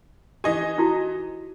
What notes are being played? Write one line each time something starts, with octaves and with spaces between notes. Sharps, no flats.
E3 G4 D#5 G#5
D#4 E4 F#4